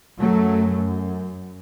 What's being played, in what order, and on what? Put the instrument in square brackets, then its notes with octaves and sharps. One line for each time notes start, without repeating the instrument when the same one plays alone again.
[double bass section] F#2 F#3 A3